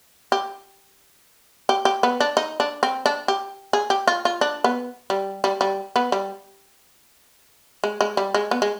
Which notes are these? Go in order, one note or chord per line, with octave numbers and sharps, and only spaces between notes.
G4
G4
G4
B3
D4
D#4
D4
C4
D4
G4
G#4
G4
F4
F4
D4
B3
G3
G3
G3
B3
G3
G#3
G#3
G3
G#3
B3
G#3